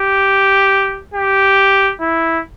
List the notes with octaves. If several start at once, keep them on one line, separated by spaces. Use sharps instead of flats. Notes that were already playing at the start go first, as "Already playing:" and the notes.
Already playing: G4
G4
E4